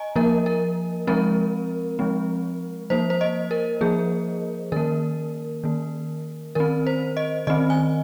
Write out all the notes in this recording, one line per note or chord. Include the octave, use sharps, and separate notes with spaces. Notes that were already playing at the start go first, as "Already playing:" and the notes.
Already playing: D#5 G#5 A#5
F3 A#3 A#4
A#4
F3 G#3 C4 A#4
F3 G#3 C4
F3 A#3 C5
C5
D#5
A#4
F3 A#3 G#4
D#3 A#3 A#4
D#3 A#3
D#3 C4 A#4
C5
D#5
D#3 C4 D#5
G#5